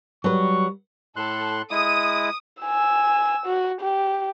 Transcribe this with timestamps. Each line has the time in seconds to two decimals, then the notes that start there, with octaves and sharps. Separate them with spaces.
0.24 F#3 G3 B4 C#6
1.16 A2 A4 C6 F#6
1.71 G#3 E4 D#6
2.62 G#5 E6
3.46 F#4
3.81 G4